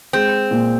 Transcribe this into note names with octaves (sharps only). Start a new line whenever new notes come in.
G#3 C4
A#2